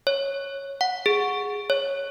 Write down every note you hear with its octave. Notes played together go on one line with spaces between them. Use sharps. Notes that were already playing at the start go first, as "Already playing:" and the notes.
C#5
F#5
G#4
C#5